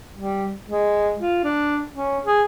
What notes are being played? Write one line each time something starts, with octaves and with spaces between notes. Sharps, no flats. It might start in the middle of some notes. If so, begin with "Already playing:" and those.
G3
G#3
F4
D4
C#4
G#4